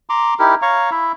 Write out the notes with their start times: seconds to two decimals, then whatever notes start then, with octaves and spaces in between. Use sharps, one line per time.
0.10 A#5 C6 D6
0.39 D#4 E4 G4 A#4
0.62 C#5 F5 A#5 C#6
0.91 E4 E5